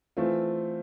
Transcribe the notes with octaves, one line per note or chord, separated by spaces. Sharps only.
E3 A3 C4 F4